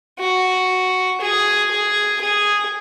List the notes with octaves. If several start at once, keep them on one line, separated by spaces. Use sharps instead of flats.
F#4
G#4
G#4
G#4